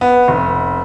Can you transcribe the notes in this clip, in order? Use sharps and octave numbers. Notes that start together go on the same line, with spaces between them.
B3
F1